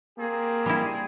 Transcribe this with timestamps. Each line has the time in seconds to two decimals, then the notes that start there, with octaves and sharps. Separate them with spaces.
0.19 A#3 C4 G4 G#4
0.66 G3 E4